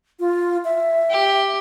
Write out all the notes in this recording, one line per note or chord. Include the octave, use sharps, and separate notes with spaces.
F4
E5
G4